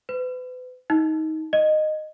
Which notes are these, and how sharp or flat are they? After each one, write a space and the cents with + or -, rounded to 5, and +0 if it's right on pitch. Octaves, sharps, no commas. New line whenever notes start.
B4 +35
D#4 +20
D#5 -15